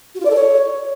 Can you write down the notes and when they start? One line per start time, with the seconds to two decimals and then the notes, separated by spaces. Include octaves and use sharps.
0.15 F#4
0.20 F4
0.25 D5
0.30 A4
0.35 C#5